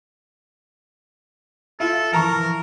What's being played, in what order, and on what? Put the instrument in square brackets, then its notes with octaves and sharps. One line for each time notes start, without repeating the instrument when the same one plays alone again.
[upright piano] E4 F4 [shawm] A4
[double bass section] E3 F3 [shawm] A#4 [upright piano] A5 A#5 C#6